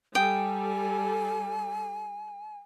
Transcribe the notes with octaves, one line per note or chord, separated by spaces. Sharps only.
G3 A4 G5 G#5 D#6